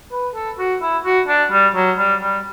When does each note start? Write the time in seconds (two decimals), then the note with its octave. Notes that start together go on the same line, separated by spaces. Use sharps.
0.12 B4
0.35 A4
0.59 F#4
0.82 E4
1.05 F#4
1.28 D4
1.51 G3
1.75 F#3
1.98 G3
2.22 G3